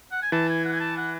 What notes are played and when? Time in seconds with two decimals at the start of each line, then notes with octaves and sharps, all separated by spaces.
0.11 F#5
0.22 G#5
0.32 E3 A5
0.49 G#5
0.65 F#5
0.73 G#5
0.80 A5
0.97 F#5